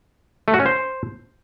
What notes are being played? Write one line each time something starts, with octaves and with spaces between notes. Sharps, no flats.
A3
F#4
C#4
C5